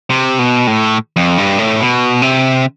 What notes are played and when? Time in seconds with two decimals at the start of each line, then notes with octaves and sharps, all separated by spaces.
0.10 C3
0.39 B2
0.67 A2
1.16 F2
1.38 G2
1.59 A2
1.81 B2
2.22 C3